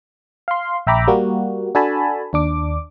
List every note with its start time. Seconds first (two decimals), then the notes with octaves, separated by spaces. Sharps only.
0.48 F5 C6
0.87 A#1 E5 G5 A#5 B5 D6
1.07 G3 A#3 F#4
1.75 D4 F#4 A4 G#5 A5 B5
2.33 D#2 D4 D6